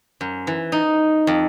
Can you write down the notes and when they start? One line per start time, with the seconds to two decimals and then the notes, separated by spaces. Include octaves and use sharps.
0.21 F#2
0.47 E3
0.72 D#4
1.27 F2